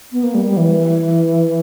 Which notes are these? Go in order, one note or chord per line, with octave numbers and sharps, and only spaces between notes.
B3
A#3
G3
G3
E3